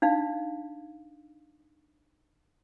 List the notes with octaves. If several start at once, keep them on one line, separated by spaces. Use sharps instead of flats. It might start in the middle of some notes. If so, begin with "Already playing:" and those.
D4 D#4 F5